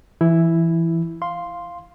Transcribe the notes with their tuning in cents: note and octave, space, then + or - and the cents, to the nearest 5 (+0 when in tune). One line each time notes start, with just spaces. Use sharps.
E3 +20 E4 +0
F5 +0 C6 +0